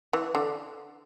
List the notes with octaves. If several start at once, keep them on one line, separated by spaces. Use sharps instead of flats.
E3
D3